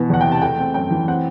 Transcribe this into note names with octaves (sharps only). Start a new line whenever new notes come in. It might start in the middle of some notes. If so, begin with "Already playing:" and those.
Already playing: B2 E3 B3
E2 F#5
G5
C3
A5
A3 G5
C4
F#2 G5
E3
C4 F#5